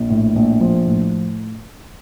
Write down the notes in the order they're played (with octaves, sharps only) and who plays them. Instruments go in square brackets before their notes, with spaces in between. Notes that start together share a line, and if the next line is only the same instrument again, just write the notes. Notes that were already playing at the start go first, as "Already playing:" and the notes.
Already playing: [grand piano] A#1
A2
A#1
F3
A2